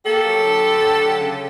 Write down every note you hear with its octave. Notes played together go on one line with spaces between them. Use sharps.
A#3 G4 A4
F#3
D3
D2
F#3
D3
C#3